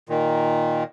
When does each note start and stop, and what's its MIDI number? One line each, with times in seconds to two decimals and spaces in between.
0.09 0.83 46
0.09 0.83 51